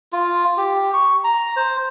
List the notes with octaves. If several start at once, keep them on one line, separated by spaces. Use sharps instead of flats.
F4
G4
C#6
A#5
C5